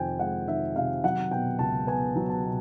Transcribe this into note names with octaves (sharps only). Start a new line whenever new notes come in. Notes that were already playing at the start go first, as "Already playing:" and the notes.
Already playing: F2 C3 D#3 G5 G#5
G#3 F#5
D#3 E5
C3 F5
F#3 F#5
B2 G5
C#2 A5
B3 G#5
F#3
A5
B2